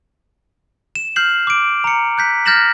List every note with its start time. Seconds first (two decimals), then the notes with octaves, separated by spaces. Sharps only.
0.95 E7
1.16 F6 G6 C7 F#7
1.47 D6 D7
1.84 A#5 C#7
2.18 F#6 G6 B6
2.45 F6 G6 A6 A#6 E7 F#7